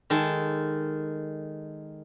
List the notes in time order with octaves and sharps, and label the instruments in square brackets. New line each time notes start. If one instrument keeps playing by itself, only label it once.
[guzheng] D#3 G#3 A4